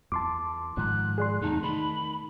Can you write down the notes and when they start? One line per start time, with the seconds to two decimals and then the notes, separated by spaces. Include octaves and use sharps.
0.12 E2 A5 C6 D6
0.77 G#2 D#3 F3 F#6
1.18 G#4 D5 C6
1.42 E2 C3 A3 D#4 A5
1.63 D#3 B5